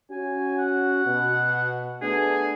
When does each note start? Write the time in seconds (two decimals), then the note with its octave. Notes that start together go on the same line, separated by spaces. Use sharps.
0.11 C#4 F#4 G#5
0.58 F#5
1.05 B2
2.02 A3 B3 D4 G#4